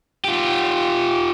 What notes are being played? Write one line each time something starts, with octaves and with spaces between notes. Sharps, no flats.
F4 G4